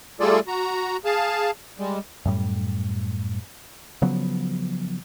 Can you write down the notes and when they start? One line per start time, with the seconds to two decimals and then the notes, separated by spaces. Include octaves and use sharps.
0.20 G3 A3 F4 G#4 A4 D5
0.47 F#4 A#5
1.05 G#4 F5 A5
1.79 G3 G#3
2.25 F#2 A2 G3
4.02 C#3 F3 F#3 B3